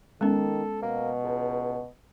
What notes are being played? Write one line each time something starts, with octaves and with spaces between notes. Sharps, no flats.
D#3 G#3 B3 C#4 A4
B2 A#3
C#2